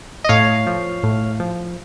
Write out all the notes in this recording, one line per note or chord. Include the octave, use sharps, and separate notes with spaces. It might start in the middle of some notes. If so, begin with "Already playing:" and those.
D#5
A2 C#5 F5
F3
A2
F3